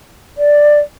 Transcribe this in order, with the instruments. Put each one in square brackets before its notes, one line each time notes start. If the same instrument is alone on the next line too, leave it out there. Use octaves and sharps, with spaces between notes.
[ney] D5